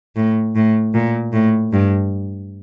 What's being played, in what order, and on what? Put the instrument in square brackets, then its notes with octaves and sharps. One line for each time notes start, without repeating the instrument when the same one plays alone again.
[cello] A2
A2
A#2
A2
G2